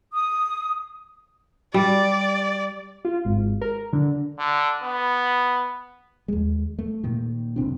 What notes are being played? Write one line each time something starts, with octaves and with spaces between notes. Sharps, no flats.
D#6
G3 D5
F4
G#1
A#4
D3
D3
B3
D#2 G#3
A3
A#2 D#3
F#1 C3 C4 D4